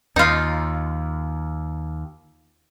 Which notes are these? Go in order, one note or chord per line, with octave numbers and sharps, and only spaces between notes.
D#2 D#4 F4